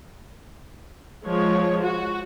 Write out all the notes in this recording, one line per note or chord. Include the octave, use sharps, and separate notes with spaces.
F3 G#3 C#5
F#4